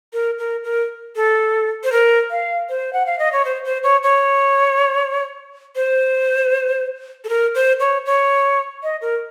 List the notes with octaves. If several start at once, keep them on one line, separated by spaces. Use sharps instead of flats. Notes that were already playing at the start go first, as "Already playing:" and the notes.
A#4
A#4
A#4
A4
C5
A#4
F5
C5
F#5
F5
D#5
C#5
C5
C5
C#5
C#5
C5
A4
A#4
C5
C#5
C#5
D#5
A#4